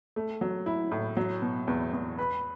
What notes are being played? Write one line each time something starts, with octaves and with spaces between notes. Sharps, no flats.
A3
F#3
E4
A2
F#3
B2
E2
E2
B4